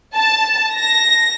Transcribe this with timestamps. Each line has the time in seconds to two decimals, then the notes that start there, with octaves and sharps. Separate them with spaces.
0.16 A5
0.73 A#6